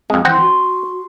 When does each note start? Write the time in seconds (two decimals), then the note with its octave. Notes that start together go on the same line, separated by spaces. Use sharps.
0.10 F2 G#3 C4
0.25 E3 C4 F#5 C6
0.40 F#4